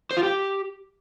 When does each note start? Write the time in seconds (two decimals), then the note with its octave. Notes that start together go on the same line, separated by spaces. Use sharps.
0.11 C5
0.17 F4
0.23 G4